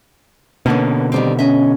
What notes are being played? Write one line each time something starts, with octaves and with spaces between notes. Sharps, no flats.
B2 D3 A#3 B3 C#4
D#3 G3 C4
C#4 D#5 E5